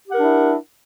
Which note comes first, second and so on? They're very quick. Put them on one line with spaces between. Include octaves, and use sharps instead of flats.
G4 F#5 A#4 D4 E4